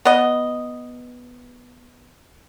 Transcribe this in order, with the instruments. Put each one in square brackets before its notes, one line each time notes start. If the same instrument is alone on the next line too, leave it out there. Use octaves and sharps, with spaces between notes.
[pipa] B3 D#5